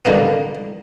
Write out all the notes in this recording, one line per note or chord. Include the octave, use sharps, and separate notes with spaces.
D3 G3 A#3 B3